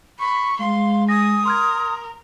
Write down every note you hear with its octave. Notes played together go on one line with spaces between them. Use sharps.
B5 C#6
G#3 F5 C6
G#5 D#6 A#6
A#4 C6 F6 G#6